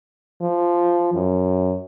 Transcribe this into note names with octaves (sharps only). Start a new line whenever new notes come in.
F3
F#2